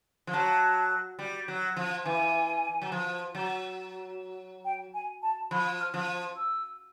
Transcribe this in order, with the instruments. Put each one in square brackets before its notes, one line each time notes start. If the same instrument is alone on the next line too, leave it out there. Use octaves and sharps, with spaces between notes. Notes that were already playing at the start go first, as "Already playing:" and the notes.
[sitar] F3
[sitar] F#3 [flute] A5
[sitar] G3
F#3
F3
[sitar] E3 [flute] G#5
[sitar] F#3
F3
F#3
[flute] G5
G#5
A5
[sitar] F3 [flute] B5
[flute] F6
[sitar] F3
[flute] E6